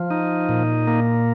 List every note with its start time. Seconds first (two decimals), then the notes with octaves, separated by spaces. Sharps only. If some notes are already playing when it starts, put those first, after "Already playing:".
Already playing: F3
0.11 D#4
0.49 A#2
0.87 A#3